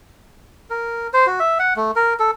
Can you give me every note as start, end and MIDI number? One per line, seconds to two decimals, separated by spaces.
0.70 1.08 70
1.13 1.26 72
1.27 1.39 66
1.40 1.58 76
1.59 1.74 78
1.76 1.91 57
1.96 2.14 70
2.19 2.31 69